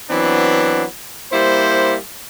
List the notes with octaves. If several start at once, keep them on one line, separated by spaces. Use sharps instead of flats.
E3 F#3 B3 C4 D4
G3 A#3 E4 C5